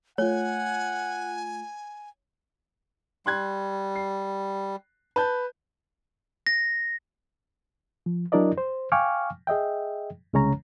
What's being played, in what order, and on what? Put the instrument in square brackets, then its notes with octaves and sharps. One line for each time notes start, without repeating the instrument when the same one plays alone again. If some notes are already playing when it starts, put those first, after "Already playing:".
[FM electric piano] A3 F4 [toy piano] C#5 [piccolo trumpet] F#5 [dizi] G#5
[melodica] G3 [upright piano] C6 F#6 G#6
[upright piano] C7
B4 A5 G6
[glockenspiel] A#6
[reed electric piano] F3
F#3 D4 E4 A#4 D5 D#5
C5
F5 G5 G#5 C#6 D6 F6
G#4 D#5 E5 G5
C2 C#3 G#3 C#4 C#5 A#5